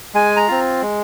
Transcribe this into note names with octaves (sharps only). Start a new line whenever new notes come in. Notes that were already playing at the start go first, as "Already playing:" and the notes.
G#3 G#5
A#5
C4 F4
G#3